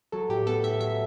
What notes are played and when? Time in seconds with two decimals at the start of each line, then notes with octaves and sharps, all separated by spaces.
0.12 F#3 A4
0.29 A2 G4
0.47 B3 A4
0.64 A2 E5
0.80 F#3 E5